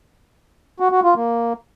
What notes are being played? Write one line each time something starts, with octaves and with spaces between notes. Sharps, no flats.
F#4
F#4
F4
A#3